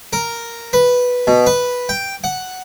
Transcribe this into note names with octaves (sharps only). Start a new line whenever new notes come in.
A#4
B4
B2
B4
G5
F#5